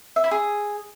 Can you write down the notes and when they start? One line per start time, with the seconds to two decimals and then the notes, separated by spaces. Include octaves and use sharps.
0.16 E5
0.24 E4
0.31 G#4